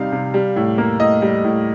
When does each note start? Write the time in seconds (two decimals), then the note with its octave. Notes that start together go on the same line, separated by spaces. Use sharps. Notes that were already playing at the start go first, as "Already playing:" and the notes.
Already playing: C3 G3 C4 D#4 F5
0.12 C3
0.34 G3
0.56 A2
0.78 A#3
1.00 A2 D#5
1.22 G3
1.44 A2